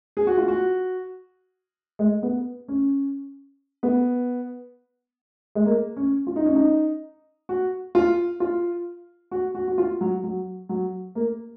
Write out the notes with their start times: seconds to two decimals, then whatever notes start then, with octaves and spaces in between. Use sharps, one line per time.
0.17 G#4
0.27 F#4
0.37 F4
0.48 F#4
1.99 G#3
2.23 B3
2.68 C#4
3.83 B3
5.55 G#3
5.66 A#3
5.97 C#4
6.27 F4
6.36 D#4
6.46 C#4
6.55 D#4
7.49 F#4
7.95 F4
8.40 F4
9.31 F#4
9.55 F#4
9.68 F#4
9.78 F4
10.01 F#3
10.23 F#3
10.69 F#3
11.15 A#3